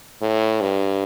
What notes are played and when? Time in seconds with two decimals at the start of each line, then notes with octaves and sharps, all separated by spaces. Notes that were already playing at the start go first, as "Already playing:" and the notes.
0.21 A2
0.61 G2